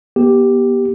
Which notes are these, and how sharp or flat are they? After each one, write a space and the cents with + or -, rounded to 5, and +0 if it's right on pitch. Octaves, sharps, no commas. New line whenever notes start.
B3 -35 G4 +0